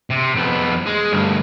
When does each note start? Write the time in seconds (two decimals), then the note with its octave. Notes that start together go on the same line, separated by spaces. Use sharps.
0.10 C3
0.36 F2 B3
0.86 G#3
1.12 D2 G2